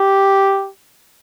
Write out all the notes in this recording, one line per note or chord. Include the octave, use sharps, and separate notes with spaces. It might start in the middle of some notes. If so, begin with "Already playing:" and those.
Already playing: G4